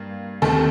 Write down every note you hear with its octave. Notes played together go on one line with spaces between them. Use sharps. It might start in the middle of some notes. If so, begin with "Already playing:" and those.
Already playing: G2 A#3
D#2 D#3 A3 C4 A4